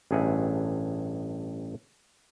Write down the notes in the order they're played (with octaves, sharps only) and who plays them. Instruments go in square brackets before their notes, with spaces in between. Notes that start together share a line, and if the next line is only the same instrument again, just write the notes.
[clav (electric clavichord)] A1 G2 G#4 E5 F#5 G#5